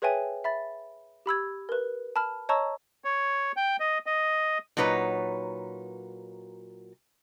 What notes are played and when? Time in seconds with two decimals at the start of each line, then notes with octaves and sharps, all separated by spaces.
0.02 G#4 B4 C#5 E5 G5 G#5
0.44 E5 B5 A6
1.26 G4 B5 E6 G#6
1.69 A#4 B4
2.16 A5 B5 F6
2.49 C#5 D#5 A5 A#5 C#6 E6
3.04 C#5
3.56 G5
3.80 D#5
4.06 D#5
4.77 A#2 F#3 D#4 B4 C#5